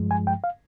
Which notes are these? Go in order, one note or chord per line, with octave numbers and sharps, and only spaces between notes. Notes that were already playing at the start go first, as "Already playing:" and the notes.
Already playing: G2 F3 G#3
G#5
G5
F5